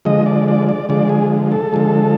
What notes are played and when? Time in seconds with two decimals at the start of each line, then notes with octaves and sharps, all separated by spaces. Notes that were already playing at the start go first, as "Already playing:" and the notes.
0.05 D3 F3 G#3 D#5
0.26 D5
0.48 D5
0.69 D5
0.89 D3 F3 G#3 D5
1.09 G#4
1.52 A4
1.73 D3 F3 G#3